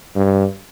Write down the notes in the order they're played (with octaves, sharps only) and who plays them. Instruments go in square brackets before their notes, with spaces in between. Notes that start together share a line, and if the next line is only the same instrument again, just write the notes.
[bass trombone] G2